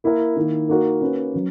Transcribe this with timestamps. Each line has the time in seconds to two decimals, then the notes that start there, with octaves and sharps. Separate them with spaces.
0.04 A#3 E4 A#4
0.36 D#3 A#3 E4
0.69 A#3 D#4 F#4 A#4
1.01 A#3 C#4 F#4 B4
1.34 F#3 C#4